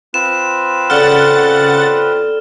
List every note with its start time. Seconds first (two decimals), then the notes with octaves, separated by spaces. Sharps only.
0.14 C4 F4 B4 E7
0.90 C#3 A4 D5 F#5 F6 A6